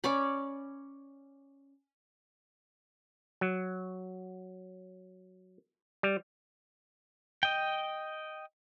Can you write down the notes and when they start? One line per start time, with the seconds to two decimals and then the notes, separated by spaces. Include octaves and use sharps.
0.04 C#4 C#5 D5 B5
3.41 F#3
6.03 G3
7.43 D#5 G5